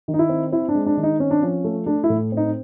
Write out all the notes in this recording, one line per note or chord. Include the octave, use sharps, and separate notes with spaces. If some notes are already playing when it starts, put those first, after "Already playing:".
D#3
D#4
E4
C4
C4 E4
D4
G#3
D4
D#3
D#4
C4 C#4
D4
F3 C#4
A3
A3 D4
E4
A2
C4 D#4